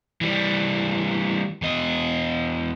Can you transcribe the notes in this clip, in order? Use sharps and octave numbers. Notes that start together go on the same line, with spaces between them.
E3 G3
E2 D#5